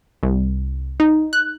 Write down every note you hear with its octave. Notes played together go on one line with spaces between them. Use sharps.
C2
D#4
F#6